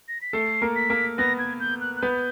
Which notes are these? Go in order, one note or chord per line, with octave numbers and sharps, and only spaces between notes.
A#6
B6
A3 A4 C7
A#3 A#4
B6
A#3 A#4
B3 B4 A#6
G#6
G6
F#6
F#6
B3 B4 G6